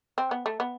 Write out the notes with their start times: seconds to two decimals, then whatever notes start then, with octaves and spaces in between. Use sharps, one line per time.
0.18 C4
0.31 B3
0.46 A3
0.60 B3